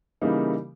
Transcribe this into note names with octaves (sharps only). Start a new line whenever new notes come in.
C#3 E3 G3 A#3 D#4